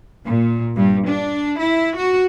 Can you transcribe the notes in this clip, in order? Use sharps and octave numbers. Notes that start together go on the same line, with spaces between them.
A#2
G2
D4
E4
F#4